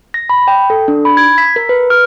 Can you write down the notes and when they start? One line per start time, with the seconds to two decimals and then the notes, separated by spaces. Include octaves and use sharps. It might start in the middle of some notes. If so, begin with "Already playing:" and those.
0.14 A#6
0.29 B5
0.48 G5
0.70 A4
0.88 D4
1.05 B5
1.17 G#6
1.38 B6
1.56 A#4
1.69 B4
1.90 F6